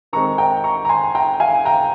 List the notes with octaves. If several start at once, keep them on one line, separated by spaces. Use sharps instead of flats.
D#3 G#3 C4 A#5 C#6
G5 A#5
A#5 C#6
A#5
G#5 C6
G5 A#5
F5 G#5
G5 A#5